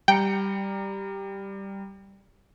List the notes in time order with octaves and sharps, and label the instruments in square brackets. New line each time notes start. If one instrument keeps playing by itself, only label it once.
[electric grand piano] G3 A#5 C#7 [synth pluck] G5